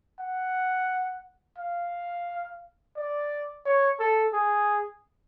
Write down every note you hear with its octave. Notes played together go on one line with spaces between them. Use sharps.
F#5
F5
D5
C#5
A4
G#4